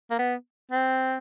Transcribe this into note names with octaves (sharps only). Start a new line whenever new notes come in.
A#3
B3
C4